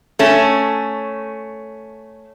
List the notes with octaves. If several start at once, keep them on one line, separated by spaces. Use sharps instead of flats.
A3 C#4